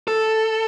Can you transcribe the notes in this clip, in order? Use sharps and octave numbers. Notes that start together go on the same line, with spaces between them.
A4